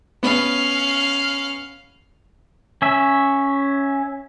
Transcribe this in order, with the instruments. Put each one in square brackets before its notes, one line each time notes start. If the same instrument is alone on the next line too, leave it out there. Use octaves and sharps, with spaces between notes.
[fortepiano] B3 [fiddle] C#4 F5
[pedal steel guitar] C#4 E5